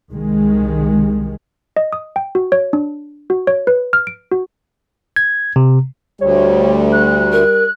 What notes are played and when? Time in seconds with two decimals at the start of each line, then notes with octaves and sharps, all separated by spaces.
0.10 C2 D#3 G#3
1.77 D#5
1.93 D#6
2.16 G5
2.35 F#4
2.52 C#5
2.73 D4
3.30 F#4
3.47 C#5
3.67 B4
3.93 F6
4.07 D7
4.31 F#4
5.16 G#6
5.56 C3
6.21 D2 G3 C#5
6.92 F#6
7.32 A#4